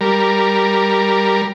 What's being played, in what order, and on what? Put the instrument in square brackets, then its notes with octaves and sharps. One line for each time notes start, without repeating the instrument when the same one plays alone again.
[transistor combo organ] G3 A#4